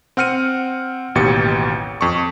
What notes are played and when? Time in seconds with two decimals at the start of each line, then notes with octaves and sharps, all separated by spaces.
0.17 C4 F#5 F6 C#7 D#7
1.15 A1 D#2 B2 G4 C#7
2.01 F2 C#6